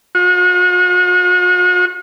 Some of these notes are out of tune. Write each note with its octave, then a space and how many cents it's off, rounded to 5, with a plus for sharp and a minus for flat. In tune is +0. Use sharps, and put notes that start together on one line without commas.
F#4 -45